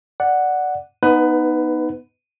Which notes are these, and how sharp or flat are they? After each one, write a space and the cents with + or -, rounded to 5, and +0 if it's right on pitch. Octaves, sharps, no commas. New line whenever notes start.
D5 +0 F#5 +0
B3 -10 D#4 +0 B4 +20